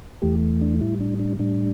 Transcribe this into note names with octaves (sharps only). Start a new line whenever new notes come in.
E2 E3 A3 G4
D4
A2 G3 E4
D4
D4
A2 G3 D4